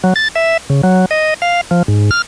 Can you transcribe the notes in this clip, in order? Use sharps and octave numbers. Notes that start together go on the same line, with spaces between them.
F#3
A6
E5
C#3
F#3
D#5
F5
F3
G#2
F6